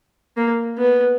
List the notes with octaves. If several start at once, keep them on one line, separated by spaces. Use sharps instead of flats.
A#3
B3